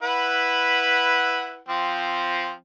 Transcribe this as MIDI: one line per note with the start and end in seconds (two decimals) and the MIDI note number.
0.03 1.60 64
0.03 1.60 71
0.03 1.60 78
1.68 2.52 53
1.68 2.52 60